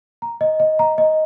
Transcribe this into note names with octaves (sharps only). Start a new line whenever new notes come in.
A#5
D#5
D#5
A#5
D#5